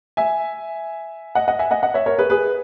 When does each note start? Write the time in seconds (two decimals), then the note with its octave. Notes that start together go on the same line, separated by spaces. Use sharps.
0.17 E5 G#5
1.35 D#5 F#5
1.48 D#5 F#5
1.59 E5 G#5
1.71 D#5 F#5
1.83 D#5 F#5
1.94 C#5 E5
2.06 A#4 C#5
2.18 G#4 B4
2.30 G#4 B4